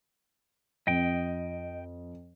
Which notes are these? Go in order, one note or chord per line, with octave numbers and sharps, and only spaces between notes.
F2 D#5 G5